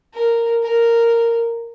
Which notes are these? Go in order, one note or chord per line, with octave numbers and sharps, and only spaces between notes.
A#4
A#4